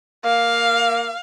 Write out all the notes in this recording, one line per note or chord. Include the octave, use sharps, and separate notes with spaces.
A#3 F5